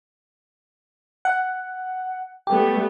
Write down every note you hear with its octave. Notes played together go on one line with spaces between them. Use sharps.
F#5
G3 A3 B3 G4